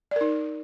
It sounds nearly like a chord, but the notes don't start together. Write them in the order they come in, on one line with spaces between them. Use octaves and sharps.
D5 A#4 D#4